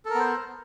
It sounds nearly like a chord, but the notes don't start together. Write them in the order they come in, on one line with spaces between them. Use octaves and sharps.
A4 A#4 B3 C5